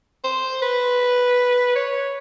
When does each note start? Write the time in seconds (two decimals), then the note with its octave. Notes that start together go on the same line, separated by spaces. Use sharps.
0.24 C5
0.62 B4
1.75 C#5